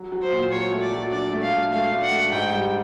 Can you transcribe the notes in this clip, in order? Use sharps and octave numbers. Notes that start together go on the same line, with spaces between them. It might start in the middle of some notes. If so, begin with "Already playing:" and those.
Already playing: F#3
F#3
C5
A#2
F#3 C#5
A3
D5
F#3
D4 D5
A3
F5
A3
A3 F5
D4
F#5
A3
G#2 G5
G3